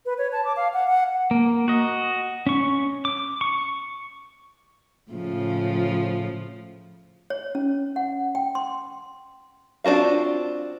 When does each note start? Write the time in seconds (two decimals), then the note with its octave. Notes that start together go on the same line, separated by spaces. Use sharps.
0.06 B4
0.18 C#5
0.32 A5
0.45 D6
0.57 F5
0.73 F#5
0.88 F#5
1.31 A#3
1.68 F#4 D#5
2.47 C#4 C#6
3.05 D6
3.41 C#6
5.11 A2 C#3 F3
7.30 C#5
7.55 C#4
7.96 F#5
8.35 G5
8.55 C6
9.84 C4 D4 F4 F#4 F5